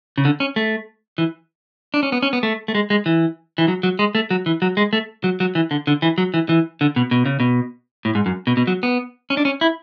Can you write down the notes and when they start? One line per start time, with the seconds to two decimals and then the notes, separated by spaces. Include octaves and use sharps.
0.18 C#3
0.25 D3
0.40 C#4
0.56 A3
1.18 E3
1.94 D4
2.03 C#4
2.12 B3
2.22 C#4
2.33 B3
2.43 A3
2.68 A3
2.75 G#3
2.90 G#3
3.06 E3
3.58 E3
3.68 F#3
3.83 F#3
3.99 G#3
4.15 A3
4.31 F#3
4.46 E3
4.62 F#3
4.77 G#3
4.93 A3
5.24 F#3
5.40 F#3
5.55 E3
5.71 D3
5.87 D3
6.02 E3
6.18 F#3
6.34 E3
6.49 E3
6.81 D3
6.96 B2
7.11 B2
7.26 C#3
7.40 B2
8.05 A2
8.15 G#2
8.26 F#2
8.47 B2
8.57 B2
8.67 F#3
8.83 B3
9.30 C#4
9.37 D4
9.45 C#4
9.61 E4